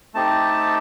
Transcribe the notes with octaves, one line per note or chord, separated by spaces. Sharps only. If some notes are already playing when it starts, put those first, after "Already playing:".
A3 C4 D#4 G4 A5